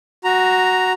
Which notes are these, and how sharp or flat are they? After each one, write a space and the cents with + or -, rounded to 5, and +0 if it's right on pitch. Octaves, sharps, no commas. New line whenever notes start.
F#4 +0 A#5 +0